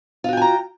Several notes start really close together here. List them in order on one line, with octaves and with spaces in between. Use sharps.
F4 F#4 G5 G#5 A#5